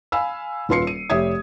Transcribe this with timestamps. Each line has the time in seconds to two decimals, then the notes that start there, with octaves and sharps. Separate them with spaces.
0.12 F5 G#5 B5 E6
0.69 D#1 F4 B4 C6 C7 C#7
0.87 D#7
1.10 F1 G4 C#5 E5 D#6 G#6